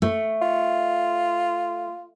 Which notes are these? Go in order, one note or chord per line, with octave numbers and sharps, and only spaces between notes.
A3
F4